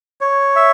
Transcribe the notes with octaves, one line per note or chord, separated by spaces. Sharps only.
C#5
E5